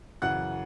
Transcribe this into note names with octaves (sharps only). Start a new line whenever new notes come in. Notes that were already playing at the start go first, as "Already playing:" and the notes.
F#2 C#3 E3 F#5 F#6